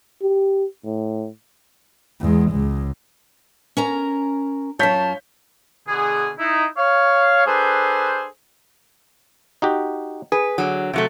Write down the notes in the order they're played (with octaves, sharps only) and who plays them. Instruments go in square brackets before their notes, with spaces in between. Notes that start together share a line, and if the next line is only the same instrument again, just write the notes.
[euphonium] G4
A2
[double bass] E2 G#3
C#2 G#3
[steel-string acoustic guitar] C#4 A#4 A#5
[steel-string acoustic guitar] F#2 F4 [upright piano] C#5 G6 B6 [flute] A5
[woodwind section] B2 D3 B3 G#4
D#4 E4
C#5 F5
D4 G#4 A4 B4 C5
[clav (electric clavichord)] D#4 F#4 G4
[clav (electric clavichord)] G#4 [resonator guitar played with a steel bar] B4
[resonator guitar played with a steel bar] D3 F#3
C3 F#3 A3